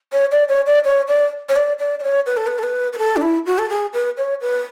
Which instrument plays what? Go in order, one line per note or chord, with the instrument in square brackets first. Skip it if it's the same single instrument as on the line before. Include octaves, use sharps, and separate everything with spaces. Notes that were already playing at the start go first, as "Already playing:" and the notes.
[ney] C#5
D5
C#5
D5
C#5
D5
C#5
D5
D5
D5
C#5
B4
A4
B4
A4
B4
B4
A4
D4
E4
F#4
A4
G#4
B4
C#5
B4